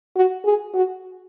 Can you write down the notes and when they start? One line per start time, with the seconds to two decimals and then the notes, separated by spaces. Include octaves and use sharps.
0.16 F#4
0.45 G#4
0.74 F#4